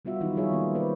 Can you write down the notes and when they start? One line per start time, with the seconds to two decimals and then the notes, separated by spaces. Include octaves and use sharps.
0.05 G3 B3 F4 F#4 E5
0.20 D#3 E3 F#3 D#4 E4
0.35 F3 G3 F4 G#4 C#5 E5
0.51 D#3 F3 A#3 B3 E4
0.75 B4 C5 D5